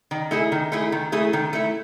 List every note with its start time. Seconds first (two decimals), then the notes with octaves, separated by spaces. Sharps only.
0.11 D#3
0.31 A3 E4 G#4
0.52 D#3
0.72 A3 E4 G#4
0.92 D#3
1.12 A3 E4 G#4
1.33 D#3
1.53 A3 E4